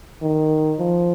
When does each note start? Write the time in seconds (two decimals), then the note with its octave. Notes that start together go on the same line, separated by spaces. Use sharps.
0.22 D#3
0.79 F3